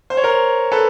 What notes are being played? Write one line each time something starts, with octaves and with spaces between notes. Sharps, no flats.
C5
C#5
A#4 C5
A4 B4